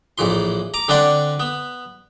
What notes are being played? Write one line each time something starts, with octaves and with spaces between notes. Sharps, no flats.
A#1 A2 E3 C6
A#5 D6
D3 C4 D4 D5 F#5 C6
B3